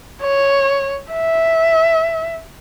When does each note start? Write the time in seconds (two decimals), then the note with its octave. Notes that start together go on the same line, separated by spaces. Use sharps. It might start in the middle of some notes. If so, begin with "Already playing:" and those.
0.22 C#5
1.13 E5